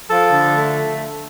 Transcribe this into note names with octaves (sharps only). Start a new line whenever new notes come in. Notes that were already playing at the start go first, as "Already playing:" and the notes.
F3 A4
D3
A3